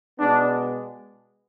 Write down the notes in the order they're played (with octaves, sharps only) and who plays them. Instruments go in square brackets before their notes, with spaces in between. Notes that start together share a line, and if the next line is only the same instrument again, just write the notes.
[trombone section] B2 G#3 B3 D4